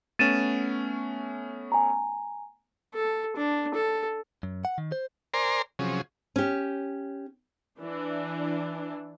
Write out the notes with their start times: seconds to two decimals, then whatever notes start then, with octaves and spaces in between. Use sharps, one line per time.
0.19 A3 B3 C#4 A6 D#7 E7
1.72 G#5 A#5
2.94 A4
3.36 D4
3.74 A4
4.43 F#2
4.65 F#5
4.78 D#3
4.92 C5
5.34 A#4 C5 D5 G#5 A#5 C6
5.79 C3 F3 F#3 C#4 G#4
6.36 C#4 G4
7.80 E3 D4